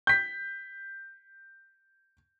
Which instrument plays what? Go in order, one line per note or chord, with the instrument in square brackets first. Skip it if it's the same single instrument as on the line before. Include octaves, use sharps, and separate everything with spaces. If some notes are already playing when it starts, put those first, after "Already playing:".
[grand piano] G6 B6